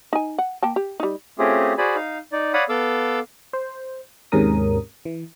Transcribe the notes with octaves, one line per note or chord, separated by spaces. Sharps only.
D#4 G#5
F#5
A#3 G5 A5
G4
G3 D#4
A3 C4 C#4 F4 G4 G#4
F#4 G#4 C5 D5 G#5 B5
D#4 F5
D#4 D5
C#5 D5 F5 F#5 B5 D#6
B3 A4 F5 D6 E6
C5
D#2 G#2 C3 C#4 A#4 D#6
E3